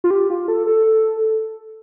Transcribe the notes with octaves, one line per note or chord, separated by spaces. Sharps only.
F4
G4
F4
A4
A4